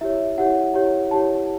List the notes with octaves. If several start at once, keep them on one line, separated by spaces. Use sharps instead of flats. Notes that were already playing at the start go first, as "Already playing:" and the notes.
E4 G4 C#5 E5
E4 G4 C#5 F#5
E4 G4 C#5
E4 G4 C#5 A5